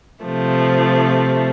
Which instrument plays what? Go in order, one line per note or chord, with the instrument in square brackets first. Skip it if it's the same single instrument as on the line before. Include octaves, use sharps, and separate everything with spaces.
[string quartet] C3 F3 A3